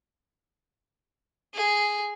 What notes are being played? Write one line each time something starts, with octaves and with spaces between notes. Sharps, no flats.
G#4